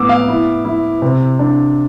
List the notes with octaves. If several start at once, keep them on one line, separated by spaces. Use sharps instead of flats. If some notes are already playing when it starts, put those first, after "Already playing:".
Already playing: A2 B3 D6 E6
F5
E4
E4
C3
D4